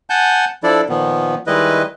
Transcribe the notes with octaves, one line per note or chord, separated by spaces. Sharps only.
F#5 G#5 A5 G6
F3 D4 E4 A4 D5
A#2 D#3 F3 B3
D#3 G3 G#3 E4 B4 D#5